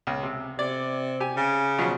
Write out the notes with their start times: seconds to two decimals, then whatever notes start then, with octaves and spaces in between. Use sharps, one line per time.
0.07 C#2
0.23 C3
0.59 C3 D5
1.20 G4 G#5
1.37 C#3
1.78 B2 F3 F#3